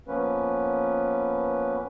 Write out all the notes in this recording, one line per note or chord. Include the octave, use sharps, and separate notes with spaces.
F3 A#3 B3 C#4 B4